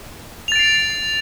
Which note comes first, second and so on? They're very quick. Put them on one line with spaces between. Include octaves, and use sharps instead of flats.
F7 A6 D7 C7